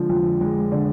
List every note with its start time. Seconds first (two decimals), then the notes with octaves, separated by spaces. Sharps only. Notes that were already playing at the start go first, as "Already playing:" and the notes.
Already playing: D3 F3 G#3
0.09 F2
0.41 G#3
0.72 D3